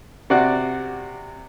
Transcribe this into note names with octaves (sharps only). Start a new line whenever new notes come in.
C3 F#4 D5 F#5